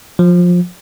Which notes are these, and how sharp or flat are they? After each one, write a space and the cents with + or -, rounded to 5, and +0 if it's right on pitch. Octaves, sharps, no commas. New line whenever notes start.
F3 +20